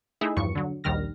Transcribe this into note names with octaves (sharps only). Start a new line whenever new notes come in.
A3 D#4 E4 G#4 E5
E2 G2 F3 C#6 C#7
D3 F#3
A#1 D#2 D#3 G3 F6 A#6